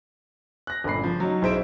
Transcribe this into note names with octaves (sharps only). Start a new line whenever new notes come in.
F#6 A#6
G1 G2 A#2 B5 C7
C#3 F3
F#3 C#4 D#4
B1 E4 G#4 C5 E5 D7